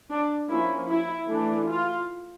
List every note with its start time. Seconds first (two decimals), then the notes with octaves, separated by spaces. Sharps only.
0.10 D4
0.49 F3 A#3 C#4 E4
0.89 E4
1.28 E3 A3 D4
1.68 F4